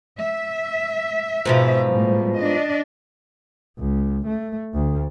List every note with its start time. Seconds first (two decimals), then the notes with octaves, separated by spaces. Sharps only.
0.18 E5
1.45 G#2 B2 F3
1.88 A2 G3
2.37 D4 D#5
3.79 C#2
4.27 A3
4.74 D2